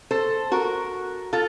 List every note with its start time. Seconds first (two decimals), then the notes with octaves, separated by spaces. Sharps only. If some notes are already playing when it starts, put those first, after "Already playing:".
0.11 A4 C5
0.52 F#4 A#4
1.33 F4 A4